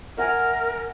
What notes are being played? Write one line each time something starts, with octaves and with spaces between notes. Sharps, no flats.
A#4 E5 F#5 G#5